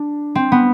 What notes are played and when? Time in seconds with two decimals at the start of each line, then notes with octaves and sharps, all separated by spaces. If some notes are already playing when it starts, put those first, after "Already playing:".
Already playing: D4
0.35 C4
0.52 B3